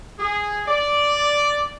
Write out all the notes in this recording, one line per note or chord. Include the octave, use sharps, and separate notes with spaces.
G#4
D5